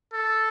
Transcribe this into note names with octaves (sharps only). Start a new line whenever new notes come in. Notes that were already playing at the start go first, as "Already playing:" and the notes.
A4